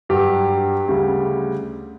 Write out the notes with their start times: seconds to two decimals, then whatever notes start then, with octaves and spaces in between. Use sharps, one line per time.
0.09 G2 F#3 G4
0.88 D2 C#3 G3